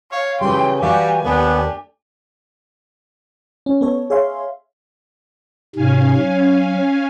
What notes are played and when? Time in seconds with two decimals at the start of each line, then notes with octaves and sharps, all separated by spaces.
0.12 C#5 F5
0.41 C#3 E3 F#3 G3 B4 G5 C6
0.81 E3 G3 F#4 G4 D5 E5 F5 G#5
1.24 D#2 A3 B3 D4 G4
3.66 C#4
3.81 B3 A4 C#5
4.10 G#4 C#5 E5 F5 C6
5.76 G#2 C3 C#4 F5 G#5
6.17 F#3